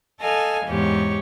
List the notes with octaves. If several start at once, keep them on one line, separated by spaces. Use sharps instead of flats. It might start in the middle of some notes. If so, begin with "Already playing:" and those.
A4 D#5 F5 G#5
E2 G#2 G4 C#5